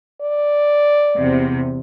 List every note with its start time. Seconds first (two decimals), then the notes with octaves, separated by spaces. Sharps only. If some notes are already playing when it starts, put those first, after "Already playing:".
0.21 D5
1.16 E2 C3